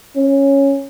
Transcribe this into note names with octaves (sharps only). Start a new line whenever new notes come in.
C#4